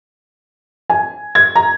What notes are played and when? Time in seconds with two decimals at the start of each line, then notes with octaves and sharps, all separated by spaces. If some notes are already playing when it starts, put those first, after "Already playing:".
0.90 G#5
1.35 G#6
1.56 A#5